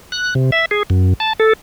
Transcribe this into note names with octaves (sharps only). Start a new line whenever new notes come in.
F#6
C3
E5
G#4
F#2
A5
A4